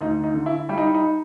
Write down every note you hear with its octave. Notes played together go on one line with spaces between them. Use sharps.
D2 D#4
D#4
D3
E4
G3 E4
D#4
D#4